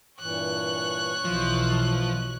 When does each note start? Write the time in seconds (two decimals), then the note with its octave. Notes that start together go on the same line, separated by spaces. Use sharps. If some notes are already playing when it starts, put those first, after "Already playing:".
0.20 G2 A#2 E3 C#5 F#6
1.25 B1 B2 E3 F3